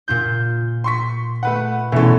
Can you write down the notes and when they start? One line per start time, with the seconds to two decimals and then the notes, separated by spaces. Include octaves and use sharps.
0.08 A#2 F4 G6
0.84 C6 C#6 B6
1.43 A3 B4 F#5
1.92 B2 D3 E3 A3 C#4 E4 A4